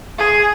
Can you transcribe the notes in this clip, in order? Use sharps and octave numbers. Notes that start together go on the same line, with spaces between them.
G#4